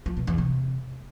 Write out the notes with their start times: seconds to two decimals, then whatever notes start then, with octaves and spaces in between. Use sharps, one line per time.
0.06 F3
0.17 B2
0.27 E2
0.38 C3